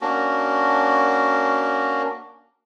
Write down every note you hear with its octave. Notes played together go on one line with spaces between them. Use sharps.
A#3 C#4 D4 F#4